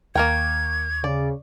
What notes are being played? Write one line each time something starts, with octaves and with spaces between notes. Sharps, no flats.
D#2 A#3 A#4 G5 C#6 D6 G#6
C#3 D5